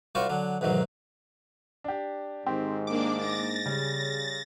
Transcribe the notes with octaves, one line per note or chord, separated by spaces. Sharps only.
C2 G3 F4 F#4 C5 C#6
D3 F#3
B1 E2 G#2 D#3 F#3
D4 G4
G#2 D#3 C4 G4
A#3 D4 D5 D6
A6 A#6
C#3 G3